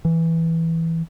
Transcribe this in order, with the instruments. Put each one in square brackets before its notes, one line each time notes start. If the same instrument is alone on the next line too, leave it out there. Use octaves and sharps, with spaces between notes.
[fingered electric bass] E3